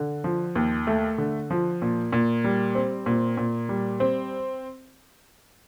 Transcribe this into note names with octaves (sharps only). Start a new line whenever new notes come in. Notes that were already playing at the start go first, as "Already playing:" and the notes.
Already playing: D3
F3
D#2
A3
D3
F3
A#2
A#2
G3
C4
A#2
A#2
G3
C4